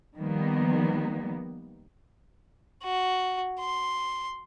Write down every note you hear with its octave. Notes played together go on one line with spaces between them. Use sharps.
D#3 F3 G3 A#3 B3
F#4
C6